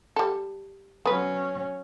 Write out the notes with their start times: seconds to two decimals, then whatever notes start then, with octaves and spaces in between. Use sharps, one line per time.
0.16 G3 A4
1.06 F#3 B3 C#4 B4